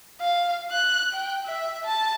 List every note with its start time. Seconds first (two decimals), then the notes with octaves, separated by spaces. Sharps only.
0.20 F5
0.71 F#6
1.13 G5
1.45 E5
1.85 A5